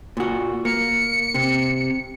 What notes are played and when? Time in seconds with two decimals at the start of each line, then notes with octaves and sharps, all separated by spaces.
0.17 A#2 F#4
0.65 A#3 C#7
1.34 C3